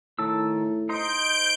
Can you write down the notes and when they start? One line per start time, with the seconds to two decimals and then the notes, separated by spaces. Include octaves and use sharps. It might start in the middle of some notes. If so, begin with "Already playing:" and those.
0.19 A2 D#3 A5 E6
0.89 D#4 C5 D#5 G6 D7